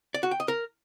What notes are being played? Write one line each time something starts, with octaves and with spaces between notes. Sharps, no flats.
D5
F#4
G5
D#5
A#4